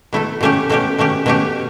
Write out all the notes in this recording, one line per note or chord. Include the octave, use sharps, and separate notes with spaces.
B2 A3 E4 A4
B2 A3 C#4 G4
B2 A3 C#4 G4
B2 A3 C#4 G4
B2 A3 C#4 G4